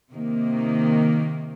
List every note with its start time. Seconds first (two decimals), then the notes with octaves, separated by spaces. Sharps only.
0.11 C3 D#3 A#3